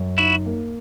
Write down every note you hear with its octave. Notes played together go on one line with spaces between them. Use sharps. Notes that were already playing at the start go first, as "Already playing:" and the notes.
Already playing: F#2
D#4 E4 F#4
A#3